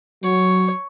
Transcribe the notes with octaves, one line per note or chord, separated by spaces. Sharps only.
F#3 C#5